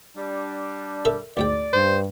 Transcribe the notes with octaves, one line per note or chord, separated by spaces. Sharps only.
G3 D4
A4 A#4 E5
D2 G#2 D5 G5
G2 C5